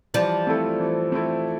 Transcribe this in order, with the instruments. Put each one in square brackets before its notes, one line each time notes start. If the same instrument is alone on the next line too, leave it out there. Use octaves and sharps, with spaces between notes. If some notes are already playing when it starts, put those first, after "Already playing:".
[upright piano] E3 [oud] F3 G3
[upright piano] A3 C4 E4 A4
E3
A3 C4 E4 A4